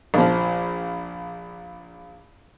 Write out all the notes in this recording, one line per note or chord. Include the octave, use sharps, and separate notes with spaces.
A#1 F3